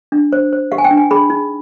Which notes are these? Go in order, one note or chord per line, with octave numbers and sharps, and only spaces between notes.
D4
C5
C5
G4 F5
G#5
G5
D4
G#5
G#4 B5
D#4